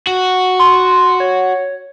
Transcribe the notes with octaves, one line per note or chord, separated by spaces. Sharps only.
F#4
C6
C#5